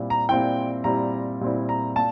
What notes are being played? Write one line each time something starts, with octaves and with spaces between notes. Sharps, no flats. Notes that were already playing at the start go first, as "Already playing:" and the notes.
Already playing: A#2 G3 C4 E4
A#5
A#2 G3 C4 E4 G5
A#2 G3 C4 E4 A#5
A#2 G3 C4 E4
A#5
A#2 A5